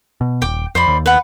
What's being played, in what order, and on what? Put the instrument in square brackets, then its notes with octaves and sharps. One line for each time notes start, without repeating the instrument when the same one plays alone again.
[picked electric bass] B2
[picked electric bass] D#1 [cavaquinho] G5 D6
[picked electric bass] F2 [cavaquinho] C5 D5 B5
[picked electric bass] D#2
[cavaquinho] B4 F#5